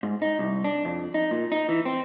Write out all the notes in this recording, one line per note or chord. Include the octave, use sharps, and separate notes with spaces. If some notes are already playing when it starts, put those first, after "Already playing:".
G#2
D#4
C2
D4
F2
D#4
A#2
D#4
E3
C4